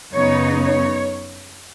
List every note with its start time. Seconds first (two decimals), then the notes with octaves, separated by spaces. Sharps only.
0.13 F#2 C#3 B3 D#4 C#5
0.64 C#5